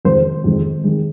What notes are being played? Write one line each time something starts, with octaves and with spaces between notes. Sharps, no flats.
F2 D#3 G#3 C5
F2 D#3 G#3
D#3 G#3